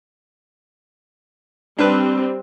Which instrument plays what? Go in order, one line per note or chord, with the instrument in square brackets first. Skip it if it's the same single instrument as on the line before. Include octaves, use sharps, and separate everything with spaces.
[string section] G3 C4 [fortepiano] D4 B4